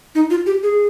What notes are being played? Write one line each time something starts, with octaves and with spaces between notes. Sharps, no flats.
D#4
F4
G4
G#4